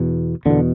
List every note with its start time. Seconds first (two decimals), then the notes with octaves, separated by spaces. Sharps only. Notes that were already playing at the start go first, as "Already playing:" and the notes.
Already playing: E2 B2
0.45 E2 B2 D3